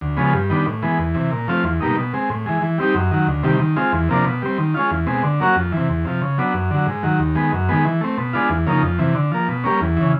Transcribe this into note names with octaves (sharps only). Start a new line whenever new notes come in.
D2
C#3 F3 G#3 B3
G2
D#3 G3 B3 D4
A2
E3 G#3 B3
E2
C3 E3
A#2
F3 A3 C4 F4
E2
B2 G3 A#3 D#4
B2
G#3 C4
A2
E3 G#3
E3
G3 C4 D#4 G4
F#2
D#3 F#3
D2
C3 D#3 G3
D#3
G#3 C4 F4
E2
C3 F3 A#3 D4
B2
G3 C4
D#3
G#3 C#4 F4
E2
B2 G#3 C4
D3
F#3 A#3 C#4 F#4
F2
C3 E3
E2
C3 F3
C#3
F#3 B3 D4
F#2
D3 F#3
G#2
D#3 F#3
D#2
D#3 G#3 B3
F#2
D#3 G#3 B3
E3
A3 C4
B2
G#3 B3 D4 F4
E2
C#3 F3 A#3 D#4
F2
C3 E3
D3
F3 A#3
B2
G3 A#3 C#4
E2
C#3 E3